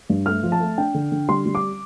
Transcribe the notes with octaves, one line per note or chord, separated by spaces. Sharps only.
G2
A3 F6
F3
A5
A3
D4 G5
D3
D3
G3 C6
G3
D6